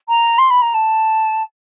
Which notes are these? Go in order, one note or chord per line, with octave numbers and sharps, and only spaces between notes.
A#5
C6
B5
A#5
A5